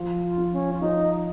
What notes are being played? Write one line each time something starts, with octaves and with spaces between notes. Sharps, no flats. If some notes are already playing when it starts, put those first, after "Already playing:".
Already playing: F3
F4
F3
C#4
F4
F3 D#4